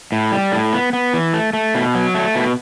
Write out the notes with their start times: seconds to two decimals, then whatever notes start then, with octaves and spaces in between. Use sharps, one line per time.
0.12 A2
0.32 G3
0.52 A2
0.73 B3
0.93 B3
1.14 E3
1.33 A3
1.53 A3
1.75 B2
1.95 F#3
2.15 A3
2.35 B2